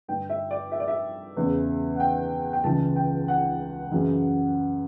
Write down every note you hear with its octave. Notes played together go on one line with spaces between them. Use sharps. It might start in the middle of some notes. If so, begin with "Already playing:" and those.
G2 D3 G5
E5
D5
E5
D5
E5
E2 C#3 E3
F#5
G5
G5
C#2 C#3 E3 A5
G5
F#5
F#2 C#3 E3